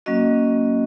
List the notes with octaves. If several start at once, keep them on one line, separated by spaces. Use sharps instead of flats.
F#3 A#3 C#4 F#4 D#5